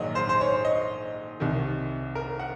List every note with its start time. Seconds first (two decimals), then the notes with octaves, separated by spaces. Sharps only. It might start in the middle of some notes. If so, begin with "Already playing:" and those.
Already playing: A#1 G#2 D#3 F#3 D#5
0.15 C5
0.29 C5
0.41 C#5
0.65 D#5
1.40 C2 C3 D#3
2.15 A#4
2.39 F#5